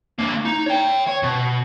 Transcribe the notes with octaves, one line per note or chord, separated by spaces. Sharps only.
D3 A#3
D#4
C#5 G5
C#5
B2